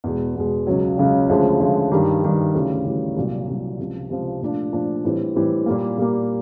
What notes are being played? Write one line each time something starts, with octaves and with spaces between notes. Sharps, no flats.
E2 B2 G#3
E2 B2 G#3
C#2 C#3 F#3
C#2 C#3 F#3
D2 C#3 F3 G#3
D2 C#3 F3 G#3
G2 D#3 G3
G2 D#3 G3
D2 C#3 E3 G3
D2 C#3 E3 G3
C2 A#2 F#3
C2 A#2 F#3
C#2 C3 F3
C#2 C3 F3
A#2 F3 A3 D4 F4
A#2 F3 A3 D4 F4
A2 E3 G3 C4
A2 E3 G3 C4
A#2 G3 A#3
A#2 G3 A#3